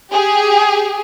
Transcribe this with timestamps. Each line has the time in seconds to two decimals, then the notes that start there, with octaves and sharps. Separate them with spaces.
0.11 G4 G#4